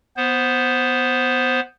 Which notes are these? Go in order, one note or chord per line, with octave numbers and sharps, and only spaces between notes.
B3 C5